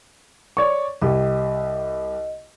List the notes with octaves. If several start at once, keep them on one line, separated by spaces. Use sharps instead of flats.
C#5 D5 C#6
C2 G4 D#5